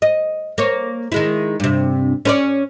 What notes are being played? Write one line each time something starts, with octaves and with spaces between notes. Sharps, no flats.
D#5
A#3 C#5
D#3 G#3 E4
G2 C3
C#4 B4 D5